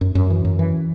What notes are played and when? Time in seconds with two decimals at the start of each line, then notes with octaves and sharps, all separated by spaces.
0.01 F#2
0.15 F#2
0.30 E3
0.45 F#2
0.59 E3